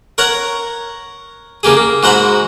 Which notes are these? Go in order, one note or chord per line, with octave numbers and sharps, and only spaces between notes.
A#4 C#5 F#5 A#5
C#3 A#3 G4 G#4
A#3
G#2 F#4 C5 A#5 B5